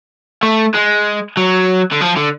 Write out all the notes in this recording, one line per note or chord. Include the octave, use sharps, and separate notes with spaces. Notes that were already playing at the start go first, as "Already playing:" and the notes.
A3
G#3
F#3
D3
F3
D3